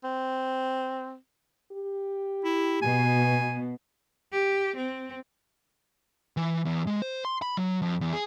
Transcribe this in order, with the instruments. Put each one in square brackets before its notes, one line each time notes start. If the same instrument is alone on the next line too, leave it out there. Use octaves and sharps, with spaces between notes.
[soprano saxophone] C4
[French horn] G4
[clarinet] E4
[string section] B2 [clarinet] G#5
[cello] G4
C4
[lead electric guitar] E3
E2
G#3
C5
C6
B5
F#3
F2
E2
G#4